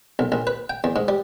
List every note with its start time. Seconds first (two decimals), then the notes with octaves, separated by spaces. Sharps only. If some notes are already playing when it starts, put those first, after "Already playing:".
0.19 B1
0.32 A#1
0.47 B4
0.70 G5
0.84 E2
0.96 G#2
1.08 G3